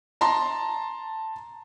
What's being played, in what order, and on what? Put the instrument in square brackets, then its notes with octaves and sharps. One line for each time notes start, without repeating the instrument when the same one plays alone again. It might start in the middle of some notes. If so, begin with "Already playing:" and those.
[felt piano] A5 A#5 C6